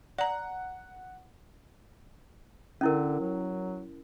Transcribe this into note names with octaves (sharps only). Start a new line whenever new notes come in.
D5 F#5 A#5
D3 C#4 E4 A#4
F#3